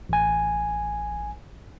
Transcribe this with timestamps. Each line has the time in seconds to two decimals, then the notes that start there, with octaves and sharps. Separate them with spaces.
0.09 A1 G#5